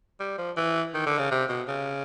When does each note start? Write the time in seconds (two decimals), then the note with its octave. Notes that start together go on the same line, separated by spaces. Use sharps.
0.20 G3
0.38 F3
0.57 E3
0.94 D#3
1.06 D3
1.19 C#3
1.31 C3
1.49 B2
1.68 C#3